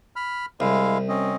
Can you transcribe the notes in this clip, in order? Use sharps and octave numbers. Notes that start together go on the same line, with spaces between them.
B5 F6
C2 G#3 E4 F5
C4 C#4 D#5